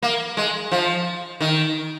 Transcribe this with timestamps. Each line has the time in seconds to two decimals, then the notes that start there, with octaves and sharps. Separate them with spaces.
0.03 A#3
0.37 G#3
0.72 F3
1.41 D#3